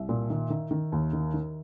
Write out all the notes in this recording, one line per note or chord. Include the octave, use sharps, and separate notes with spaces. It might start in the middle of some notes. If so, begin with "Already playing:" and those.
Already playing: C2 E5
A#2
D#3
D#3
D#3
D#2
D#3
D#3